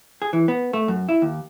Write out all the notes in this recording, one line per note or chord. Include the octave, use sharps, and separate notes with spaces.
G#4
E3
B3
A3
F#2
E4
D#2